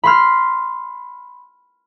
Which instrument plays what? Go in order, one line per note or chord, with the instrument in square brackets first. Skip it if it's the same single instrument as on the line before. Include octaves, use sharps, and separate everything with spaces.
[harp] B5 C6 F6